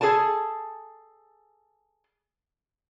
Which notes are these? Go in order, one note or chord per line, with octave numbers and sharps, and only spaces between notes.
G#4 A4 G#5 A5